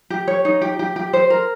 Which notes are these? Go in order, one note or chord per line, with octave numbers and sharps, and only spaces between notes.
G4
C#5
D#4
G4
G4
G4
C5
A#4